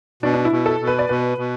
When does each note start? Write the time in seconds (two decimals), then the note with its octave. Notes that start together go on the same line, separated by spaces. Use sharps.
0.23 B2 D4
0.34 D4
0.45 E4
0.52 B2
0.66 A4
0.80 B2
0.87 B4
0.99 D5
1.09 B2 B4
1.38 B2